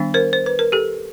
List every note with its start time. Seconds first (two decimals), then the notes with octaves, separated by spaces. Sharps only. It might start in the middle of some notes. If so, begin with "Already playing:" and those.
Already playing: D#3 G3 B3 D4
0.14 A#4 C5
0.33 C5
0.46 B4
0.59 A#4
0.72 G4 A4